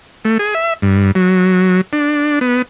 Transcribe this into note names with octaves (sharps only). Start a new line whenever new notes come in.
A3
G#4
E5
G2
F#3
D4
B3